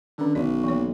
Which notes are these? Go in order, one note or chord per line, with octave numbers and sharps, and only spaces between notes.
D3 D#3 C#4
B1 D5
E3 A#3 C#5